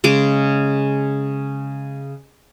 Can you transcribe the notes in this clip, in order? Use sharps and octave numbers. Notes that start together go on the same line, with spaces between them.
C#3 G#3 D6